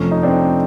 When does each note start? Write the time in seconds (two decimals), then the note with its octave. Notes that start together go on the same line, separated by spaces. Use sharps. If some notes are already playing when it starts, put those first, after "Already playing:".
Already playing: F2 C3 F3 A3 C#4
0.11 D#4
0.23 C4 D4